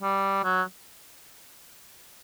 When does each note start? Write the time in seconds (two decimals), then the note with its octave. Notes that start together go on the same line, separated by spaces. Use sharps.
0.02 G3
0.44 F#3